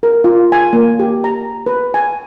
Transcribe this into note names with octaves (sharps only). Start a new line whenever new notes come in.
A#4
F4
G#5
A#3
G4
A#5
B4
G#5